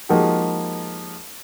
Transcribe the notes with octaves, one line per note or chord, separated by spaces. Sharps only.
F3 G#3 A#3 D#4 F#4 G4